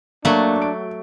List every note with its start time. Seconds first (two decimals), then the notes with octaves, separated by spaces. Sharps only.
0.25 F#3 A3 A#3 D4
0.62 D7